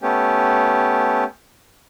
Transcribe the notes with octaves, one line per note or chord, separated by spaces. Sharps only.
A3 B3 C#4 G4